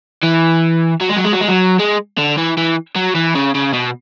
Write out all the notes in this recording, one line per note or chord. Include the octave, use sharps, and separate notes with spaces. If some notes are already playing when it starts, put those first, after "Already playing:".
E3
F#3
G#3
F#3
G#3
F#3
G#3
F#3
G#3
D3
E3
E3
F#3
E3
C#3
C#3
B2